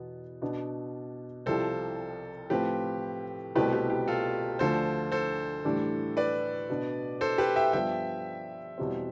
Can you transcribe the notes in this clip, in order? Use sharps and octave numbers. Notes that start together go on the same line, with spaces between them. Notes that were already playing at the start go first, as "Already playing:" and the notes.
Already playing: E2 B2 B3
B2 B3 D4
C2 C3 F3 C4 E4 A4 C5
A2 F3 C4 G4 B4
C2 B2 A3 C4 E4 G4 B4
G4
G4
F4 A4
D2 D3 F3 A4 C5
A4 C5
A2 E3 G3 D4
B4 D5
B2 B3 D4
A4 C5
G4 B4
E5 G5
G2 F3 B3 E5 G5
E2 B2 G3 C4